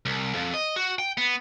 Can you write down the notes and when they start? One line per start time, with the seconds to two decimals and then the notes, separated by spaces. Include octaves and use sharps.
0.06 C2
0.35 F2
0.54 D#5
0.76 F#4
0.99 G5
1.17 B3